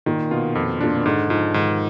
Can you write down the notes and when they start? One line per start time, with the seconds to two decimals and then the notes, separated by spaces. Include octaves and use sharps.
0.06 A#2 D#3
0.31 B2 F4
0.55 F2
0.81 A#2 D4
0.95 B2
1.05 G#2 D3
1.30 G#2 F3
1.54 G#2 D#3